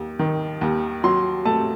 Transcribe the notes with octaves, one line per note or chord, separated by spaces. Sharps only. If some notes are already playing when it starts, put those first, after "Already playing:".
Already playing: D#2
D#3
D#2
F#3 C6
A3 A5